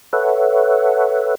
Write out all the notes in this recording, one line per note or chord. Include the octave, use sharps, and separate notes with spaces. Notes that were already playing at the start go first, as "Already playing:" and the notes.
A4 B4 C#5 E5 F#5